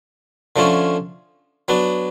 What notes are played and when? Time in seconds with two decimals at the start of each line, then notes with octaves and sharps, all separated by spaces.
0.56 D3 F3 A3 C#4
1.68 F#3 B3 D4